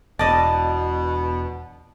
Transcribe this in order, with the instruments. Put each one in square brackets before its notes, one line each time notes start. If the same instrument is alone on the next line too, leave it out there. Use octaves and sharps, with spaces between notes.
[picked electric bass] E1 [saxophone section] B2 [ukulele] D5 D#5 [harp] A5